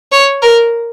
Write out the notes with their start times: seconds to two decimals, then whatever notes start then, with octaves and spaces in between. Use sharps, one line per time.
0.12 C#5
0.42 A#4